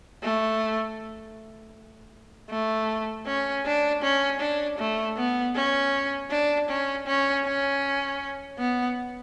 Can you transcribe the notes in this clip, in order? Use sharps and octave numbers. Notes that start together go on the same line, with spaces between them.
A3
A3
C#4
D4
C#4
D4
A3
B3
C#4
D4
C#4
C#4
C#4
B3